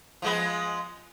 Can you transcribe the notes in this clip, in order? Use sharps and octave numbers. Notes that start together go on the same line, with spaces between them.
F3 G#3 B3